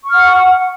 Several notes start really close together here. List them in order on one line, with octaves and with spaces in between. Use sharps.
C#6 F6 F#5